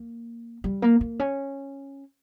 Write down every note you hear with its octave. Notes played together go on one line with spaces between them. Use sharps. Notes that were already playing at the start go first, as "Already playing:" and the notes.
Already playing: A#3
G3
A#3
A#3
C#4